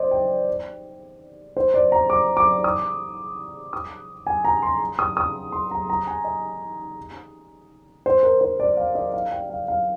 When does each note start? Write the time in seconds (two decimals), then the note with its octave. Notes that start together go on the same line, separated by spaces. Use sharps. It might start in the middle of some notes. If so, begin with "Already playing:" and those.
Already playing: C5 D5 D#5
0.11 G5
1.57 C5
1.74 D5
1.92 A#5
2.10 D6
2.37 D6
2.64 D#6
3.73 D#6
4.27 G#5
4.45 A#5
4.63 C6
4.99 D#6
5.17 D#6
5.52 C6
5.71 A#5
5.90 A#5
6.07 G#5
6.24 D#5
8.06 C5
8.23 A#4
8.41 C5
8.60 D5
8.77 F5
8.95 D#5
9.14 F5
9.32 G5
9.50 F5
9.68 F5